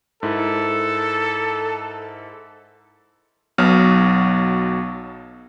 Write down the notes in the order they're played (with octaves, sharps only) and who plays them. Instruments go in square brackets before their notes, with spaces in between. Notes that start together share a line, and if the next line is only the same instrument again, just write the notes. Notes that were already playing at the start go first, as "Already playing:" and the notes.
[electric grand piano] G#2 E4 A#4 [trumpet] A4
[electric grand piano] B1 B2 F#3 F6